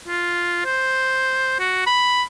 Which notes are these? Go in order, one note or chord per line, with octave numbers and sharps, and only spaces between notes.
F4
C5
F#4
B5